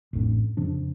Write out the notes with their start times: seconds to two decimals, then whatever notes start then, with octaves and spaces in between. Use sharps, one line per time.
0.13 A1 F2 A2 D4
0.57 F2 C#3 F3 D4